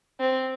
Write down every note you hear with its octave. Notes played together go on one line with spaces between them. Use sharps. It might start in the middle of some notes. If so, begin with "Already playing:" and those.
C4